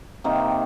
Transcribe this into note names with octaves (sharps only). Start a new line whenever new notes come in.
C3 D#3 A#3